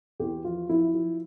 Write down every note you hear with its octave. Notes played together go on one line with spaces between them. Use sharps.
E2 G4
F3 F4
F3 E4
F3